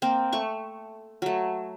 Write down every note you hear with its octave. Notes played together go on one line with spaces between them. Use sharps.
A#3 C4
A3 C#6
F#3 A3